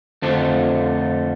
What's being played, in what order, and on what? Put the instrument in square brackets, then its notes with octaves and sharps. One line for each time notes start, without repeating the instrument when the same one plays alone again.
[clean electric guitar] F2 D3 F3 A3